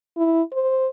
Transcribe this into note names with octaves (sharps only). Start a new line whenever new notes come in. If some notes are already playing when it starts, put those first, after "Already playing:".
E4
C5